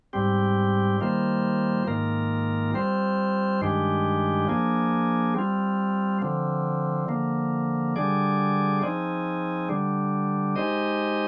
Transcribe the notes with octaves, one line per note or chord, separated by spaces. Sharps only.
G#2 G3 C4 G4
D#3 G3 A#3 F4 C5
G#2 D#3 A#3 F4 A#4
G3 C4 F4 C5
G2 D#3 G#3 D4 G4
F3 A#3 D4 G#4
G3 C4 F4
D3 F3 C4
D3 F3 A#3
D3 G3 D4 G#4 D5
F3 C4 D#4 G#4
D3 G3 D4
G#3 D#4 G4 C5 D#5